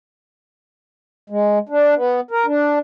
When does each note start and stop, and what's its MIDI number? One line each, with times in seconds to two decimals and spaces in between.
1.30 1.59 56
1.69 1.95 62
1.96 2.20 59
2.31 2.46 70
2.46 2.79 62